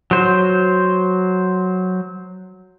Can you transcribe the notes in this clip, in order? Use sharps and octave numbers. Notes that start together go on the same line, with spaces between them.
F#3 C5